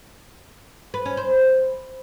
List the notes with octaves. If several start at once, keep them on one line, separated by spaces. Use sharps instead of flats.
B4
C#4
C5